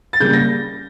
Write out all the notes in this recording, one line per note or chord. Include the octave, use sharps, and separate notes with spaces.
A6
C#3 G3 A#3 G6
A#6